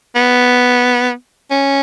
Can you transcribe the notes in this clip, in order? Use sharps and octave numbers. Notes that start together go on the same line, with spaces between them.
B3
C#4